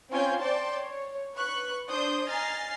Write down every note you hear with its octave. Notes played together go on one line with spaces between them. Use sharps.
C4 C#4 F4 G5 G#5 G6
C5 D5 G5 A5 C6
C#5
B4 C#6 F#6
D4 C5 C6 D#6 G6
D#5 G#5 A#5 F6 A6 C7